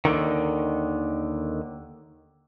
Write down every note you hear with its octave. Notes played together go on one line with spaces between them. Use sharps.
D#2 G#2 D3 D#3